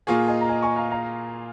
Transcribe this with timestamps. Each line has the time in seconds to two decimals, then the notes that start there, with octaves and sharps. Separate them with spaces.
0.07 A#2 A#3 F4 G#4 G#5 C#6
0.28 D#5 G#5
0.41 A#5
0.49 D#5 G#5
0.62 G#5 C#6
0.76 F5 A#5
0.91 F5 A#5